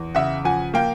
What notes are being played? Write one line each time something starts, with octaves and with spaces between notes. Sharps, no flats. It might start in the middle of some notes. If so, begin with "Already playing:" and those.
Already playing: E2
C#3 E5 F#5
F3 F#5 G#5
A#3 F5 G5